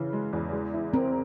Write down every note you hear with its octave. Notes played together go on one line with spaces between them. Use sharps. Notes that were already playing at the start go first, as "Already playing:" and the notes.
Already playing: C#3 E3
G#3
E2
G#3
E4
C4 A#4